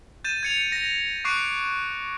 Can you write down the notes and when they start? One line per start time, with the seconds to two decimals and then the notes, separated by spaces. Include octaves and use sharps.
0.24 G6 A6 D#7 E7
0.43 G#6 C#7 F7
0.72 A#6
1.25 C#6 D6 F#6 C7 D7